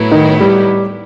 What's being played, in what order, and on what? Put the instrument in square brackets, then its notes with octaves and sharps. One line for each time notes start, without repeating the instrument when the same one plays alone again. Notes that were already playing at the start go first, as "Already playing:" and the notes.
Already playing: [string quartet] A2 F#3 B3 E4
[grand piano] D#3 D#4
G3 G4